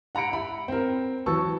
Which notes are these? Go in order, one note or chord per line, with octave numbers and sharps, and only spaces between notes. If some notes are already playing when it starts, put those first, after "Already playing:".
F#5 A#5 B5 C#7 D7
E5 B5
C4 A#4
E3 F#3 B4 A5 C#6 E6